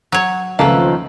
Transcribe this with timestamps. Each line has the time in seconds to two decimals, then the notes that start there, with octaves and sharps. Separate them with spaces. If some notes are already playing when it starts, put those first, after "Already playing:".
0.12 F#3 C#5
0.59 C#2 D#3 F3 A3 A#3 A4 B4